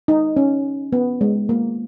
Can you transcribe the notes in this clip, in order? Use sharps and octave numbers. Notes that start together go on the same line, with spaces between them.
D#4
C#4
B3
G#3
A#3